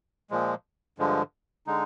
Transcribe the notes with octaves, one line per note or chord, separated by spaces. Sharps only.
A#2 F3 G#3
G2 D3 F3 G#3
D3 G#3 D#4